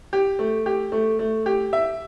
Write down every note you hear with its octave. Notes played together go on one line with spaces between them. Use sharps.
G4
A3
G4
A3
A3
G4
E5